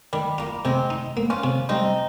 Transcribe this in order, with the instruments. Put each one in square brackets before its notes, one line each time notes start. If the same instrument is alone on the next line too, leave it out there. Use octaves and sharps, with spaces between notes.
[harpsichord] D#3 [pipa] G3
[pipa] A#3 [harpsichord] F4
[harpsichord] C3 [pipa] G#3 C4
[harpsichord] D#4
A#3
[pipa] C#4 F4
[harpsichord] C3
[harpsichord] G3 [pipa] C4 D#4